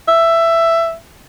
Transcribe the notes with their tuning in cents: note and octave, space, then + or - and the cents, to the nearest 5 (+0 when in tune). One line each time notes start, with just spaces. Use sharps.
E5 +10